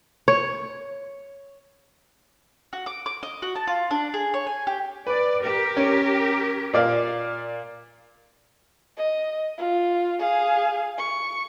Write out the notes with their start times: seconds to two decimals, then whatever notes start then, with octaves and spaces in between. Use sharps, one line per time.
0.28 C#5
2.73 F#4
2.86 D6
3.06 D6
3.23 D#5
3.42 F#4
3.56 A5
3.67 F4
3.91 D4
4.14 G#4
4.34 C#5
4.47 G#5
4.67 G4
5.07 B4 D5
5.43 G4 A#4
5.77 C#4
6.73 A#2 D5 F5
8.97 D#5
9.58 F4
10.19 G#4 F5
10.98 C#6